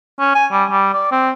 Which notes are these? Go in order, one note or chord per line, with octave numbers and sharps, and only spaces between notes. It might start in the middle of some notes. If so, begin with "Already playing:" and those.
C#4
G#5
G3
G3
D5
C4